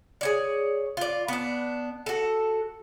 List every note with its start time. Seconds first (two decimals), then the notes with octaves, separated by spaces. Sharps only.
0.21 G#4 C#5 D5
0.97 F4 D5
1.28 B3 D4
2.06 F#4 A4